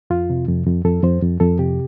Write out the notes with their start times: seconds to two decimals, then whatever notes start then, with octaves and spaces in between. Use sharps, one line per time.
0.10 F2 F4
0.30 C3
0.48 F2
0.67 F2
0.85 F2 A4
1.03 F2 C5
1.22 F2
1.40 F2 A4
1.59 C3 G4